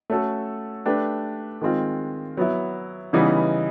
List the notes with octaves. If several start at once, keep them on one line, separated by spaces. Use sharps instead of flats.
A3 C#4 F#4 A4
A3 D4 G4 B4
D#3 G#3 C4 F4
F#3 B3 E4
C#3 E3 G3 B3 D#4